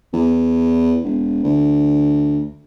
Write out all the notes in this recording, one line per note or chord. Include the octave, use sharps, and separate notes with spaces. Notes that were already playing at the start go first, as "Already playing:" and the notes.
E2
E1
D2